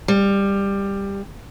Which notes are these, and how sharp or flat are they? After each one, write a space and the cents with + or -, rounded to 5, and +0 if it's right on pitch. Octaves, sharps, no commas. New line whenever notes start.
G3 +15